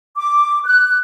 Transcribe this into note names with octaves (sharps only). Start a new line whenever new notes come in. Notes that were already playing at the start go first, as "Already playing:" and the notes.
D6
F#6